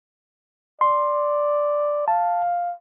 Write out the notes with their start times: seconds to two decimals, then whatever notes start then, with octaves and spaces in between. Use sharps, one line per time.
0.81 D5 C6
2.08 F5 A5